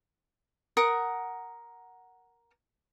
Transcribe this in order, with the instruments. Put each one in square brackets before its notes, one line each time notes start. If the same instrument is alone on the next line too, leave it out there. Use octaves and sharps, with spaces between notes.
[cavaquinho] A#4 F#5 D#6